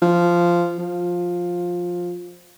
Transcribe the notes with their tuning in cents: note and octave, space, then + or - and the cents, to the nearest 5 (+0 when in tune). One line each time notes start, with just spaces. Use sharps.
F3 -10
F3 +10